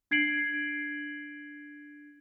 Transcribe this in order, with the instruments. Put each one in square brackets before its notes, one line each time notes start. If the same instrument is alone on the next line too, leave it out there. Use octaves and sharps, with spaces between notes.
[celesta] D4 G#6 C7 D7 F#7